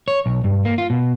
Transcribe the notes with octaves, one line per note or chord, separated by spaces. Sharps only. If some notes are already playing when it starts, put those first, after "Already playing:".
C#5
B1
G2
A#3
F4
B2